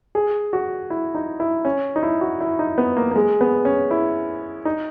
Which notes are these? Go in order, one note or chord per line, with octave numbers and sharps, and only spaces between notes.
G#4
F#4
E4
D#4
E4
C#4
D#4
E4
F#4
E4
D#4
B3
A#3
A#3
G#3
B3
C#4
E4
D#4